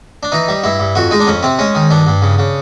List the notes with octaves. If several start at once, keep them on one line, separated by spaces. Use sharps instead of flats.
D4
E3 D#4
G3
G2 E4
G2
F2 F#4
G#3 D#4
D4
F2 C#4
C3 C4
G#3 C#4
D#3
G2 D4
G2
C#3
C#3